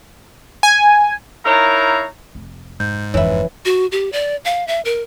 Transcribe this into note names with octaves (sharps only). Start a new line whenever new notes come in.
G#5
D#4 E4 A#4 C#5 F5 A#5
F1
G#2 G6
F#1 F2 E3 E4 C#5 E5
F#4
G4
D5
F5
E5
A#4